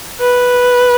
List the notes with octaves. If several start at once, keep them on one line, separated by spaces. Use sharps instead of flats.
B4